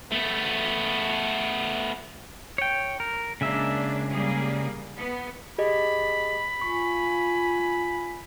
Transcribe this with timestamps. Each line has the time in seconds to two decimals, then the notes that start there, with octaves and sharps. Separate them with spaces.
0.12 A3 B3
2.58 C#5 G5
3.00 A#4
3.41 C#3 G#3 A#3 D4 E5
4.11 G3 A#3 G#4
4.97 B3
5.58 G4 G#4 D#5 B5
6.62 F4 G#5 C#6